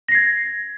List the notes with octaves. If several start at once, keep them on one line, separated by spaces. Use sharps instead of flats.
G#6 A#6 C7